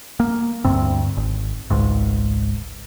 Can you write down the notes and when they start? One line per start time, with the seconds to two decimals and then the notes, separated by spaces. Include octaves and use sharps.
0.20 A#3
0.64 D2 G2 C4
1.17 G#1
1.70 G#1 C#2 G#2